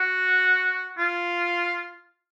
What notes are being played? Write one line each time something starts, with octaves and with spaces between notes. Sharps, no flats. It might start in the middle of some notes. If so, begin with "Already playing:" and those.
Already playing: F#4
F4